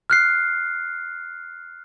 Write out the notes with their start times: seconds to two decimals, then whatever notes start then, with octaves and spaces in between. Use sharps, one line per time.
0.10 F6 F#6 C7